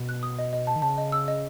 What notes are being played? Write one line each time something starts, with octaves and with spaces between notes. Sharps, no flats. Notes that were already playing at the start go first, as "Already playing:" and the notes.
Already playing: B2
F#6
D#6
D#5
D#5
A5
D#3
C#3 A5
D#5
E6
D#5